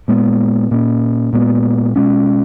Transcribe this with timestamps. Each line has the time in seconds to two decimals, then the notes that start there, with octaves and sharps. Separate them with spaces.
0.08 A#2 G#3 B3
0.71 A#2 A#3 C#4
1.33 A#2 G#3 B3
1.96 B2 G#3 C#4